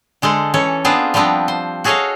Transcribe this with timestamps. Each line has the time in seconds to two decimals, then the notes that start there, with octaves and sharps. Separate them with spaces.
0.22 D3 G#3 A4 C5
0.54 E3 C#4 A4 C#5
0.85 B3 C4 D4 F4 G#4 C5
1.14 F3 G3 B3 C4 D4
1.48 C5
1.84 F#4 G#4 A4 C#5 D#5 F5